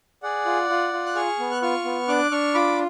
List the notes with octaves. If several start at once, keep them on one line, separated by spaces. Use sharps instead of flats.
G#4 D5 F#5
F4
F4
F4
F#6
G#4 C#6 F6
B3
F#6
F4 C#6 F6
B3
D4 D6 F#6
D4 C#6 F6
F4 B5 D6